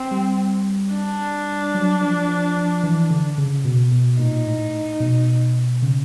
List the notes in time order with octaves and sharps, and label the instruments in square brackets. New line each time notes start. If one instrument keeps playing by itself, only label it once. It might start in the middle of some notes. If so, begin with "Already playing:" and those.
Already playing: [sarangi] C4
[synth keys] G3
[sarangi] D4
[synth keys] F#3
F3
F3
F3
E3
D3
C#3
B2
B2
[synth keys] A#2 [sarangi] D#4
[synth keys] A2
A2
B2
C#3